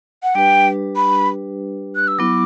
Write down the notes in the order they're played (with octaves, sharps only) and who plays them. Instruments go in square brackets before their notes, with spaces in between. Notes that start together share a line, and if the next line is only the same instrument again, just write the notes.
[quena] F#5
[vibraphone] G3 D4 G4 B4 [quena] G5
[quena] B5
F#6
E6
[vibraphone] F#3 B3 E4 [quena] D6